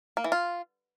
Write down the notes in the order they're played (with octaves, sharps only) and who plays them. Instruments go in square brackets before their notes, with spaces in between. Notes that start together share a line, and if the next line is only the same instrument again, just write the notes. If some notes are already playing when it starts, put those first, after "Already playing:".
[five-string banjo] A#3
E3
F4